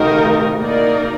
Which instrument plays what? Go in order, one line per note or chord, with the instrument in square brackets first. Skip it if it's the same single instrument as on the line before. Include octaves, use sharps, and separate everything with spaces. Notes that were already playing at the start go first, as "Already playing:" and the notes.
Already playing: [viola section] D#3 A3 D#4 G4 A#4 [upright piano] D#6
[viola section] A#3 D#4 A#4 D5